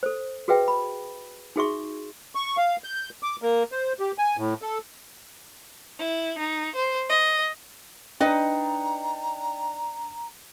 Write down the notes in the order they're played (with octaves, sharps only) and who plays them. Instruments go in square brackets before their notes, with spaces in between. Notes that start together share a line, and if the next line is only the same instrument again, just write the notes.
[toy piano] A4 C5
F#4 G#4 B4 E5 G5
B5
D#4 F#4 G#4 E5 C6 C#6
[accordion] C#6
F5
G6
D6
A#3
C5
G4
G#5
A2
A4
[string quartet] E4
D#4
C5
D#5
[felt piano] D4 [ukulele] D#4 B4 D#5 [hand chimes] G5 [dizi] A#5